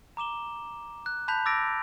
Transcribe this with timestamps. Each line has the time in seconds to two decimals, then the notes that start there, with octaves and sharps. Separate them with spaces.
0.17 A#5 D6 E7 G7
1.06 F#6
1.28 A5 B5 F#6 G6 B6 F7
1.45 D6 E6 A6 A#6 D7